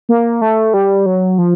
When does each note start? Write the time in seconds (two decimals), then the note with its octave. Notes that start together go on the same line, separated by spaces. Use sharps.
0.09 A#3
0.41 A3
0.74 G3
1.06 F#3
1.38 F3